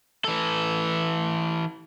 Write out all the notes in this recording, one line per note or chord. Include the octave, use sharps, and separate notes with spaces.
E3 A4